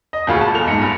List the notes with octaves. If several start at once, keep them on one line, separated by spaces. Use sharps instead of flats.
D#5
D#1 D2 F4 G#4 B5 C#6
A5
E2 A3 F7
A#1 G#2 C#7
G2